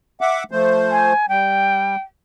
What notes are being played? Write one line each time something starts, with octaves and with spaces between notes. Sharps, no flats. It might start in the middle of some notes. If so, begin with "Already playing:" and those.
E5 F#5 D6
F3 A3 C5
G#5
G3 G5